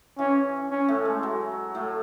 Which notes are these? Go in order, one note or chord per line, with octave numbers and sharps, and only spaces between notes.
E3 C#4
C#4
A2 A3
G#3
F#3
A2 A3